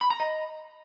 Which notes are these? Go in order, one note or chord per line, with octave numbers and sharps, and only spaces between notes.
B5
A#5
D#5